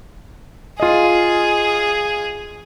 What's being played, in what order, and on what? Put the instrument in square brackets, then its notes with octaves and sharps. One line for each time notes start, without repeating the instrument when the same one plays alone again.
[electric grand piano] F4 D#5 [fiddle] G#4